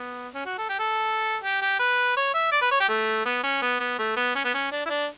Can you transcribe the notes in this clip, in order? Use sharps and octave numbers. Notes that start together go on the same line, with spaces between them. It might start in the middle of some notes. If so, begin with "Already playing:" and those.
Already playing: B3
C#4
F#4
A4
G4
A4
G4
G4
B4
C#5
E5
D5
B4
C#5
G4
A3
B3
C#4
B3
B3
A3
B3
C#4
B3
C#4
D4
E4
D4